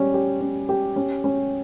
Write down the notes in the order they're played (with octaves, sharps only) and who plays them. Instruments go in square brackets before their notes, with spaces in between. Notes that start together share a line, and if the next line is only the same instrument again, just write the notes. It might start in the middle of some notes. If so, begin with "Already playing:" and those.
Already playing: [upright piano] G3 C#4
G4
C#4
G4
C#4
C#4